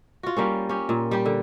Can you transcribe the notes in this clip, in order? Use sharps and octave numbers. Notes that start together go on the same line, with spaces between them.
F4 F#4
G3 A#3 C#4
C#4 G4
A#2
G3 G4
D3